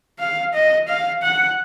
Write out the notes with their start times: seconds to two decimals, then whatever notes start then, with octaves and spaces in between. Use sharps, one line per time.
0.19 F5
0.54 D#5
0.88 F5
1.23 F#5